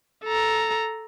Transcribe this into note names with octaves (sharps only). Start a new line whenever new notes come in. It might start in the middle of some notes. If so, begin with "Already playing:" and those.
A4 A#5